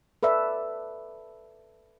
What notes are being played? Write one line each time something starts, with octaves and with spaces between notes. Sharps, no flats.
A4 B4 D5 E5